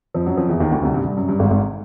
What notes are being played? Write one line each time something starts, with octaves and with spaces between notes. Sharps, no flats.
F2 F3
F#2 F#3
F2 F3
E2 E3
D#2 D#3
D2 D3
C2 C3
G2
G2
F#2
G2
G#1 G#2
G#1 G#2